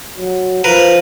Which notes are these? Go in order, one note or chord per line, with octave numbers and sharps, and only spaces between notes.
F#3
F3 A#4 B4